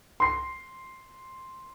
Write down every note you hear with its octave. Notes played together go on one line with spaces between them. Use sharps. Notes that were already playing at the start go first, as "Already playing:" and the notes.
C6 C7